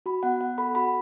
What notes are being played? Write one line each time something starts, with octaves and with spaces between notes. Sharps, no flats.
F#4 B5
B3 F#5
B3 F#5
A4 B5
F#4 B5